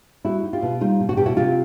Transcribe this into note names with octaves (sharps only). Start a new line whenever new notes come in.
G3 E4 F#4
D#4
F4 G4
B2
G3 D#4 F4
B2
F#4
B2 G4
E4 F#4
C3 F4 G4